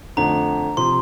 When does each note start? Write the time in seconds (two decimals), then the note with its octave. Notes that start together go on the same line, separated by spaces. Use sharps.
0.17 F2 D3 F3 A3 A#5
0.77 C3 F3 C6